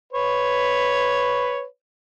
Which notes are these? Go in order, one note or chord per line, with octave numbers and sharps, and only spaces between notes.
B4 C#5